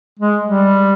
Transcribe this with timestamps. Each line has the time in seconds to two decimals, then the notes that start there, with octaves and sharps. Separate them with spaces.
0.19 G#3
0.45 G3